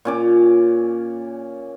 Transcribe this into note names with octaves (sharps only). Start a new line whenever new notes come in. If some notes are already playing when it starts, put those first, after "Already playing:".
A#2 C#4 D6